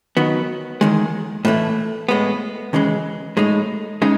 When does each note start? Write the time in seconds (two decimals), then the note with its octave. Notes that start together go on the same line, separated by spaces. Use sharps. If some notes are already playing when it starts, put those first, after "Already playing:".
0.17 D#3 F#3 B3
0.81 E2 D#3 G#3
1.45 A2 E3 A3 E4
2.09 A2 G#3 B3
2.73 D#2 C#3 E3 G#3
3.37 A2 G#3 D#4
4.02 C#3 G#3 D#4